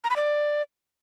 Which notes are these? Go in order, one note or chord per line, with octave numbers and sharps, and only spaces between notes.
A#5
B5
D5